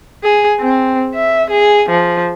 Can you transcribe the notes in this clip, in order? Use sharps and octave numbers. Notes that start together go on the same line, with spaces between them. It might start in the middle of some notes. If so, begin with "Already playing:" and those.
G#4
C4
E5
G#4
F3